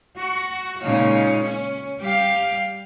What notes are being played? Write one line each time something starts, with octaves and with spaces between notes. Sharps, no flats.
F#4
A#2 C#3 G#3 D#4 C#5 F5
C#4
G3 G4 F5